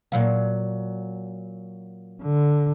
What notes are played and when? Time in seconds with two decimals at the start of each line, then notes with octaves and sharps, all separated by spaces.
0.12 A#2 F#3 F5
2.22 D3